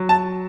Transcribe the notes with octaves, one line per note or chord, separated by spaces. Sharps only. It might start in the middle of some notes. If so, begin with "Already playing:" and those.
Already playing: F#3
A5